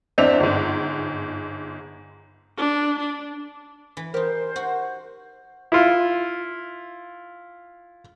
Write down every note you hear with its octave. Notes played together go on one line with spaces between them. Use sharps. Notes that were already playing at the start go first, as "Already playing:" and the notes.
E2 C4 D4 E5 F7
G1 G#2
D4
D4
E3
D#4 G4 A#4 C5
F#4
E4 F4